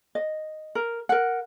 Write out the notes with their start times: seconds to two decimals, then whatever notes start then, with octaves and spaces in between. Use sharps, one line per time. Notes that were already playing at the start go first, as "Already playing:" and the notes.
0.15 D#5
0.75 A#4
1.09 A#4 F#5